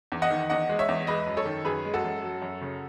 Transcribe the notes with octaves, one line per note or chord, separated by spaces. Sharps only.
E2
D#5 F#5
D#3
E2 D#5 F#5
G#3
C#5 E5
E2
G#3 B4 D#5
F#2
A4 C#5
D#3
F#2 G#4 B4
G#3
F#4 A4
F#2
F#3
F#2
C#3